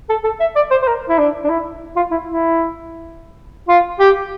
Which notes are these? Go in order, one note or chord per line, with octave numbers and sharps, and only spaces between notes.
A4
A4
E5
D5
C5
C5
A#4
E4
D4
D4
E4
F4
E4
E4
F4
G4